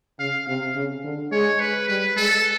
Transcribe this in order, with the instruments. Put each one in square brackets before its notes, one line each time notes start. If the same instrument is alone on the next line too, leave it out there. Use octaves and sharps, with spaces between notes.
[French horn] C#3 [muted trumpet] F5
[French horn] C3 [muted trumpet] F5
[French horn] C#3
D3
[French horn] G#3 [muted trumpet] C#5
[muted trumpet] B4
[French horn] G3 [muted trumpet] B4
[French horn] G#3 [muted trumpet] A4